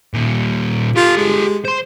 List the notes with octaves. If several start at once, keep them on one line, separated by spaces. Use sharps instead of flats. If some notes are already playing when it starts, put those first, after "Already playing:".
A#2 D#3
F4 G4 A4
G#3
C5 C6